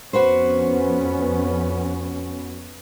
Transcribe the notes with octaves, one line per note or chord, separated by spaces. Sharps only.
F2 B3 C#4 F#4 B4 C5